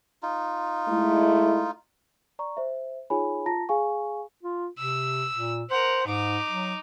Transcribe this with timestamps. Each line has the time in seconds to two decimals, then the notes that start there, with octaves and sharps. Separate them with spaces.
0.23 D#4 F4
0.88 G#3 A3 E4
2.39 D5 A#5 C#6
2.57 C5 E5
3.10 D#4 F4 G#4 C#5 G#5 B5
3.46 F4 A5 A#5 A#6
3.69 G#4 F5 G#5 C#6
4.43 F4
4.78 C3 E6
5.32 A#2
5.71 A#4 C5 F#5
6.07 G#2 D#4 D6
6.50 F#3